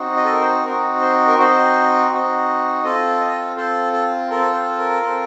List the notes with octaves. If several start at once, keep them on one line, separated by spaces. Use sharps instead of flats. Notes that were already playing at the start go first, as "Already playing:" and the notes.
Already playing: C4 D#4 F#4
D#5
A4
A#4
C5
C4 D#4 F#4 A#4
C5
A#4
C4 D#4 F#4 C5
C4 D#4 F#4
C4 F4 A4 D#5
D#5
C4 F4 A4 C5
A4
C4 F4 A4 A#4
C5
A#4
C4 F4 A4